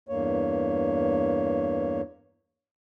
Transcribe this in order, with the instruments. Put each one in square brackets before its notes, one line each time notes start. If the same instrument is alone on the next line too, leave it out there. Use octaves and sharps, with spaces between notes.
[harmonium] E2 G2 A#3 C#5